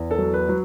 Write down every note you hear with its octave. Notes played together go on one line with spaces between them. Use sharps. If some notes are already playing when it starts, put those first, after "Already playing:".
Already playing: E2
A4
F#3
B4
F#3